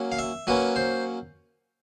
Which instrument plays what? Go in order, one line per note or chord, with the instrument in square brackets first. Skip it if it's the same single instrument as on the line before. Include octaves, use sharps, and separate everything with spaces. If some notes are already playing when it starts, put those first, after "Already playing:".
Already playing: [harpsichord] F#3 A#3 C#4
F5
E5
F#3 A#3 C#4 B4
C5